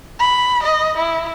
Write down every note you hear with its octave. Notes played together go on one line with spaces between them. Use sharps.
B5
D#5
E4